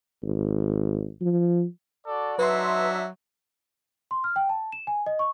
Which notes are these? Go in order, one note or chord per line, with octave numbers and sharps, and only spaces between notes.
G#1
F3
F#4 A4 D5
F#3 D4 D#4 B4 E5 C6
C6
F6
G5
A5
E7
G#5
D#5
C#6